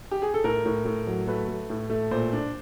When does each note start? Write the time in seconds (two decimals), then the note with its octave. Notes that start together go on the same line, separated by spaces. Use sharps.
0.11 G4
0.22 G#4
0.34 A4
0.44 A2 A#4
0.65 A2
0.85 A2
1.07 F#3
1.27 A3 B4
1.48 A3
1.70 A2
1.90 A3
2.11 A#2 C5
2.33 D4